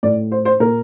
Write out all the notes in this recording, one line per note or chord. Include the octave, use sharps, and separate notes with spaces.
A2 D5
C5
C5
A#2 A#4